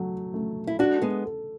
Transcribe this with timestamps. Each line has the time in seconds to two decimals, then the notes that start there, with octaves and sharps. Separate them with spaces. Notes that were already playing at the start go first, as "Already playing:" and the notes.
Already playing: F#3 A3
0.34 A3
0.67 E4
0.79 D4 F#4 A4
1.02 G#3 B3
1.26 A4